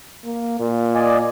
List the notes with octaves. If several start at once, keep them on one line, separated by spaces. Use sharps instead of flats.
A#3
A#2
D5 D#5 G#5